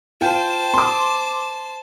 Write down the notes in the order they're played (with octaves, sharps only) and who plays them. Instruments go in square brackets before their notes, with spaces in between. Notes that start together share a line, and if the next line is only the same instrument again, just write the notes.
[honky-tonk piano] F4 G5 [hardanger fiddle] C5 A5
[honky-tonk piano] C6 D6